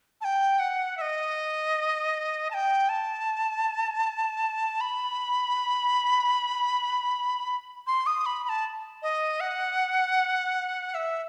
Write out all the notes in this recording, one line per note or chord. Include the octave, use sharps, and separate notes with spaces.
A5
G5
F#5
E5
D#5
A5
G5
A5
B5
C6
D#6
B5
B5
A5
D#5
F#5
E5